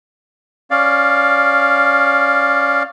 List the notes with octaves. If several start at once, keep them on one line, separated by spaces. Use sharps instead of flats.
C#4 D5 F5